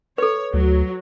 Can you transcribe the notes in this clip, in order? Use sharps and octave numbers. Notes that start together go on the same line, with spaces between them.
A4 B4 C#5
D2 F#3